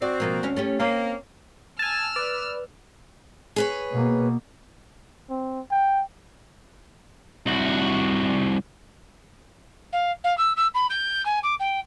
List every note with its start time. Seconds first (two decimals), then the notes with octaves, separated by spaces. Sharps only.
0.02 C4 F#4 D5
0.20 B2 F3 A#3
0.43 D2 C#4 F5
0.56 A3 C#4 G4
0.80 A#3 C4 C#4
1.79 G#5 A5 E6 F6
2.16 B4 D5
3.56 G#4 B4 C#5
3.92 B2 A#3
5.30 C4
5.71 G5
7.46 C2 F#4
9.92 F5
10.24 F5
10.37 E6
10.56 E6
10.74 B5
10.90 G6
11.25 G#5
11.43 D6
11.59 G5